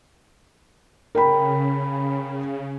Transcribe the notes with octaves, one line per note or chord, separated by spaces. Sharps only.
C#3 A#4 G5 B5